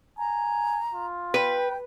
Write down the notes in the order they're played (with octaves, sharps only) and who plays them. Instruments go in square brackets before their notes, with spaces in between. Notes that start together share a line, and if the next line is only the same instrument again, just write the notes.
[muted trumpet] G#5 [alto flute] A#5
[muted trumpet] F4
[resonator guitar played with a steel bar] B4 [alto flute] G5